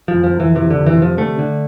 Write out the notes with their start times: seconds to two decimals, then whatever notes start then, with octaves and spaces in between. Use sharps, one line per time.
0.08 F3
0.14 F2
0.24 F3
0.34 F2
0.40 E3
0.55 C3 E3
0.70 D3
0.76 F2
0.86 E3
0.97 C3 F3
1.17 D3 A3
1.39 D3